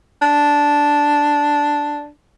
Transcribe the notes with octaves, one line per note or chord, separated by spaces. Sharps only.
D4